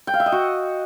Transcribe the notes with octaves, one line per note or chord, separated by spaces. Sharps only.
G5
F5
E5
D#5
F#4